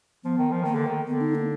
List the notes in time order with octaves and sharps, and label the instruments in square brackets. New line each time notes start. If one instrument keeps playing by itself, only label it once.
[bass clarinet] F3 [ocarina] B3
[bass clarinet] D#3
F3
[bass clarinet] D#3 [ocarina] A#3
[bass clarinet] D3
D#3
[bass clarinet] D3 [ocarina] B3
[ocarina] D#4
A#3